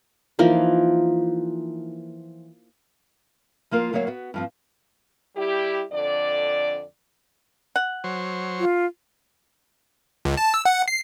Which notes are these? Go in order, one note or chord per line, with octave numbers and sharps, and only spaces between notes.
E3 F3 A#3 D#4
F3 A#3 F4 A#4
D2 F#3 A#3 C#5 D#5 F5
B3 F#4
G2 F3 C4
G3 E4 G4
F2 D3 D5
F#5
F#3 C5 C#5
F4
C#2
A5
E6
F#5
C7